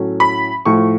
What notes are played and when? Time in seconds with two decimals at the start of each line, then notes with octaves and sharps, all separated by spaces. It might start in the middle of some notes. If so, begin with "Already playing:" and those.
Already playing: A2 F#3 A3 C#4
0.20 B5
0.65 A2 F3 A3 C#6